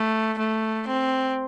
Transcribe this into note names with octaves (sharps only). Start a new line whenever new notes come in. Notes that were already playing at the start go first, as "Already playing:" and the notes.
Already playing: A3
A3
C4